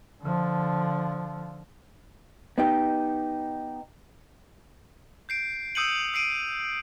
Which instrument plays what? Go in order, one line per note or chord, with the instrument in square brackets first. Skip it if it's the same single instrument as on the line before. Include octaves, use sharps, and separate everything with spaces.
[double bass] D3 F3
[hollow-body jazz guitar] B3 D#4 G4
[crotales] G6 C7 D7
D#6 E6 G6 C#7 D#7 F#7
E6 C7 D7 D#7